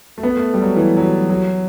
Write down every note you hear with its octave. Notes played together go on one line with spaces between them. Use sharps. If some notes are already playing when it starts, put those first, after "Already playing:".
A3
B3
A3
G3
F#3
E3
F#3
E3
F#3